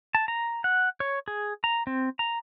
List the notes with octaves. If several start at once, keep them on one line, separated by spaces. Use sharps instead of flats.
A5
A#5
F#5
C#5
G#4
A#5
C4
A#5